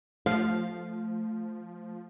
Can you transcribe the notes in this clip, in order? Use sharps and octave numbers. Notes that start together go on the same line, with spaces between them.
F3 A3 F5